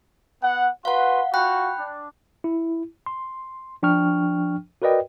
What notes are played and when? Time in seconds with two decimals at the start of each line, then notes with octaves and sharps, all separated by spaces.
0.43 B3 F#5
0.85 F#4 B4 F5 F#5 C6
1.34 F4 F#4 G5 B5 F#6
1.78 D4
2.44 E4
3.06 C6
3.83 F3 D4 G5 C#6 F6
4.82 F#4 A#4 B4 D5 D#5 G5